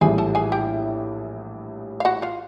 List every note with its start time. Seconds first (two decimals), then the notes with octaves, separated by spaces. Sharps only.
0.01 A#1 A2 E3 G3 G#4 G#5
0.18 A4 A5
0.35 G#4 G#5
0.52 G4 G5
2.00 F5
2.05 F#4 F#5
2.22 F4 F5